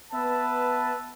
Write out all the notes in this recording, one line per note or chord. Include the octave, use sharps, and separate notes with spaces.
B3 B4 E5 A5